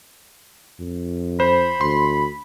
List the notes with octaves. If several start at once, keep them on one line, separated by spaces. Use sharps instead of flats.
F2
C5 B5
D2 C6